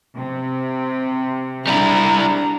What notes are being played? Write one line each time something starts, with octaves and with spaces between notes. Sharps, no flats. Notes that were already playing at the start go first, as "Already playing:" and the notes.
C3
G3 D4 E4 A#5